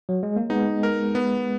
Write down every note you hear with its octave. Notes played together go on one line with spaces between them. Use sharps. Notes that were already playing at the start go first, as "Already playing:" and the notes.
F#3
G#3
A#3
G#3 B3 D#4
A#4
B3